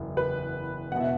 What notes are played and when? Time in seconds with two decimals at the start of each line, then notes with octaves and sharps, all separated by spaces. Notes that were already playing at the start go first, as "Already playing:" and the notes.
Already playing: F#1 E2 E3
0.17 B4
0.91 E1 F#5
0.96 B2 E5